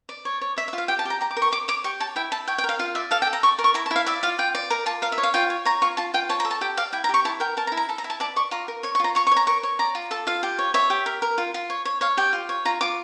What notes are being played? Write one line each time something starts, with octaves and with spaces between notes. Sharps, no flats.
D5
C#5
C#5
C#5 E5
E5
F4
F5
G4 G5
A5
G4 A#5
G4 A#5
D6
A#4
C#6
C#5 D6
C#5 D6
G4 C#6
C#5 A5
E4 G5
E4 A5
C#5 G5
G5
A#4 F5
F4 F5
D5 E5
A4 F5
G5
A4
A#5
D5 C#6
A#4
C#6
E4 A#5
A5
E4
F5
D5 E5
F4 F5
F4 G5
D5
A#4 A#5
F4 A5
A#4 F5
E5
C#5
F5
F4 G5
C#5
C#5 A#5
F4 C#6
F4 A5
F4 G5
C#5 A5
A#5
A4
A5
G4 G5
D5 F5
E4 G5
A#5
G4 C#6
E4 A5
A#4 G5
A#4 A5
A#5
E4
A#5
A4 A5
A#5
E4
A5
D5 A5
D5 C#6
F4 A#5
A#4
C#5 C#6
C#6
F4 A#5
C#5 C#6
C#6
C#5
A#5
A#4 C#6
C#5
D5 A#5
F4
A4 A5
F4 F5
G4
C#5
C#5 E5
G4
A#4
A#4
F4
F4
C#5
C#5
C#5 F5
G4 G5
F4
C#5
F4 A#5
F4 D6